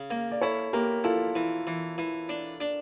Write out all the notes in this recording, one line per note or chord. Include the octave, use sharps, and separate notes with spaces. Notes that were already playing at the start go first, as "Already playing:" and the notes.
Already playing: C#3
A#3
D5
E4 A4 C#5
A#3 G4 A#4
E4 F4 A4
E3
E3
E3
D4
D4